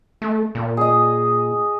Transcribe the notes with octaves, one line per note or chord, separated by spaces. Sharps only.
A3
A#2
G#4 D#5